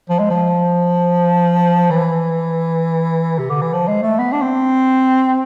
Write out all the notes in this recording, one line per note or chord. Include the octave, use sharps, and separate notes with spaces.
F3
G#3
F3
E3
C3
D3
E3
F3
G#3
A3
B3
D4
C4